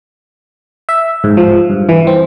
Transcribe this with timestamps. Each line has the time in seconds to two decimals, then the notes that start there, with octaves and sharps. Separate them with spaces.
0.89 E5
1.24 G#2
1.37 F3
1.70 G2
1.89 E3
2.07 C4